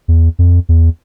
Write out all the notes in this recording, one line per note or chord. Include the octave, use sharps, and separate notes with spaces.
E2
F2
E2